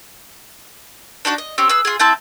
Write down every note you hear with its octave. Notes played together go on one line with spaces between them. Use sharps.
D4 D#4 F#4 D5
D#5
C4 C#4 G4
G#4 B4 E6
F4 G#4
C4 E4 A5 G6